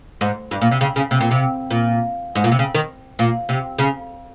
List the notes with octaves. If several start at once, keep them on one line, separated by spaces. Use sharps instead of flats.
G#2
G2
A#2
C3
C#3
C#3
C3
A#2
C3
A#2
G#2
A#2
C3
C#3
D#3
A#2
C3
C#3